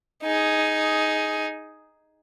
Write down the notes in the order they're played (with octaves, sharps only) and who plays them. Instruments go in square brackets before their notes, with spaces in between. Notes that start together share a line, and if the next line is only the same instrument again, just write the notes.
[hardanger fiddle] D#4 G#4